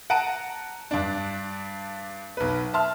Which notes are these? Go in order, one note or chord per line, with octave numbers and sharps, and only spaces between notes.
F#5 A5 A#5 D7 D#7
G2 D4
B1 B4
E5 A5 C6 F6